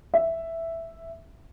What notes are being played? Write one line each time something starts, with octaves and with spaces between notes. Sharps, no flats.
E5